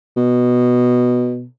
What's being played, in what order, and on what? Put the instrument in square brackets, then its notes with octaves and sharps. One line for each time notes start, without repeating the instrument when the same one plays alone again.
[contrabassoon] B2